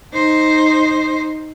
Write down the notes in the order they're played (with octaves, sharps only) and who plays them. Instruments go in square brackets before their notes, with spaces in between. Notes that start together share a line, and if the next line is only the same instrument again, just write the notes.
[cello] D#4 C5